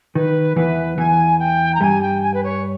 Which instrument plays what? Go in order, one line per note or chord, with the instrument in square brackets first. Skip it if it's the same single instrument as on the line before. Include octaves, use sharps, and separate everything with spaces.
[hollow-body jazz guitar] D#3 [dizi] B4
[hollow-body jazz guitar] E2 E3 [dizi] B4
[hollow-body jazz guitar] E2 E3 [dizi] G#5
[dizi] G5
A#5
[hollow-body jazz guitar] G2 G3 [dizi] G#5
[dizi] G5
G#5
B4
C#5